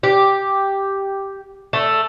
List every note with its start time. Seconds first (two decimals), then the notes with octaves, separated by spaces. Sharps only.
0.03 G4
1.73 A3